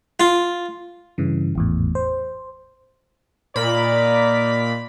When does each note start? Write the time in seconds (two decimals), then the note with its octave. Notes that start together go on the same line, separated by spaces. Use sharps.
0.20 F4
1.18 G2 C#3 E3
1.55 G#1 E2 A2
1.95 C5
3.56 A#2 D#4 A#4 D5 B5